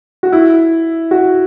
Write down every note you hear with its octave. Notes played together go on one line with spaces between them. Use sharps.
F#4
E4
F#4